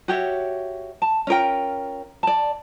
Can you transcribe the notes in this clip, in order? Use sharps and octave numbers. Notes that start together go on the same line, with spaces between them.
F#4 G4 C#5 E5
A5
C#4 F4 A#4 G5
D5 A5